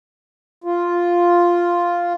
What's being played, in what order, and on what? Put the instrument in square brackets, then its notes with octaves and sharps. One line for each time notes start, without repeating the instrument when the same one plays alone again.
[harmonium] F4